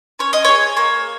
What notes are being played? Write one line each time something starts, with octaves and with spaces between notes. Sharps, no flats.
C#4 C#5
D#5
G#4 C#5
A#3 C#5